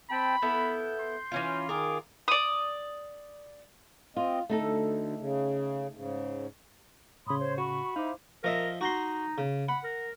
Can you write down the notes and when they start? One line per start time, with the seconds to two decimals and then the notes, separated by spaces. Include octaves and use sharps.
0.11 C4 G5 A5 B5
0.42 B3 E4 A4 G6
1.01 C6
1.32 E3 C#4 F4
1.69 D#3 F4 G#4 A#4 D6
2.28 D5 D#6
4.17 C4 F4 D#5
4.50 D2 A3 D#4 A4
5.19 C#3
5.95 G#2 C#3
7.27 A2 C#3 C#5 B5 C6 D#6
7.39 C5 C#5
7.58 F#4 B5 C#6
7.96 D#4 E4 C5 F5 D6
8.44 F3 A#4 D#5 E5
8.81 D#4 F#4 A#5 C6
9.38 C#3
9.69 F#5 B5
9.84 A#4